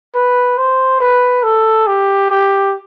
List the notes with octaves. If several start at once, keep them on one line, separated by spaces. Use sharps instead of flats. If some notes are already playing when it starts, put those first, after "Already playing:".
B4
C5
B4
A4
G4
G4